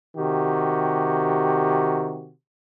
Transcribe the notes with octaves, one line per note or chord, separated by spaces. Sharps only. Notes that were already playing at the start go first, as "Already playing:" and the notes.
C3 D#3 F#4 G4